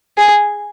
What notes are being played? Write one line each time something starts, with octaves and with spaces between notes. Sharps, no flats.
G#4